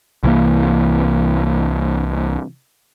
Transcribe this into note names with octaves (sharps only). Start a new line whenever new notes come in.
C2 E3 A#3